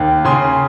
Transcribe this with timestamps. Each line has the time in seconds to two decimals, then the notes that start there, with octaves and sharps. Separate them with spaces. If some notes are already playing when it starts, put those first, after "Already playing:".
Already playing: D#2
0.25 C#3 G#5 C6